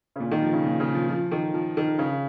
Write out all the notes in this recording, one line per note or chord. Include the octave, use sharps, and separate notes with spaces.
C#3
A#2
D#3
F3
C#3
A#2
C#3
F3
F3
D#3
F3
D#3
C#3